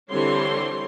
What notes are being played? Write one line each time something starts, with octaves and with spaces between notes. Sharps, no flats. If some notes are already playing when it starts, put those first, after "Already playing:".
D3 E3 G3 C4 C#5 C6